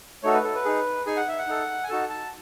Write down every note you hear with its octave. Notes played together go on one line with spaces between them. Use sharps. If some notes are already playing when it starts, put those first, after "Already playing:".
A3 D#4 F#4 A4 C#5
B4
A4
B4
D#4 G#4
D#4 G#4 G#5
F#5
E5
F#5
D#4 A4
G#5
D#4 F#4 A4 A5
A5